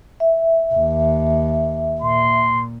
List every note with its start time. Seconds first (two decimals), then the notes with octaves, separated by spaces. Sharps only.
0.20 E5
0.74 D#2
2.01 A#2 C6